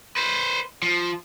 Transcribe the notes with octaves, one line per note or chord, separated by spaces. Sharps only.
B4 C5
F3